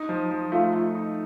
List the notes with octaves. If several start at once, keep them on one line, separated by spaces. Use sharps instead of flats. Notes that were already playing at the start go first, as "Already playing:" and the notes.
Already playing: D#4
F3
F3
A3 F4
A3
D#4